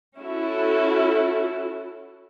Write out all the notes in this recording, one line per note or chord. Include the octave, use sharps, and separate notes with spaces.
C#4 E4 F#4 A4